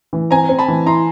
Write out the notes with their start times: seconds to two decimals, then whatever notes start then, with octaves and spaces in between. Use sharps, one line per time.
0.13 E3
0.31 C4 G#5 A#5
0.49 C4
0.59 A5 B5
0.68 E3
0.86 E4 A#5 C6